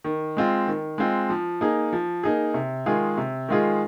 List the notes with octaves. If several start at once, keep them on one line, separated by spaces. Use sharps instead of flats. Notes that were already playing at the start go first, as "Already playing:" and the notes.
D#3
G#3 C4 F4
D#3
G#3 C4 F4
F3
A#3 D#4 G#4
F3
A#3 D#4 G#4
C3
D#3 G#3 F4 G#4
C3
D#3 G#3 F4 G#4